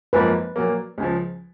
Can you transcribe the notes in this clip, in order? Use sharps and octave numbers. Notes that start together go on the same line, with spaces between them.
G#1 F#2 F3 A#3 B4
A#2 F#3 A#3
C#2 C#3 F3